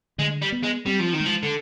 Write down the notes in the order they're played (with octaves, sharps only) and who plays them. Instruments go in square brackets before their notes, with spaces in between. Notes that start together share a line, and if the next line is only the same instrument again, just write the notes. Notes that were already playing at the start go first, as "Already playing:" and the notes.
[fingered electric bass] D3 [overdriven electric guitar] G#3
[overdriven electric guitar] G3
[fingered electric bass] B3
[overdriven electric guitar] G#3
[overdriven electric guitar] G3 [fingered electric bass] C4
[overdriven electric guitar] F3
D#3
[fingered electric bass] G#3
[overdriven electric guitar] F3
D3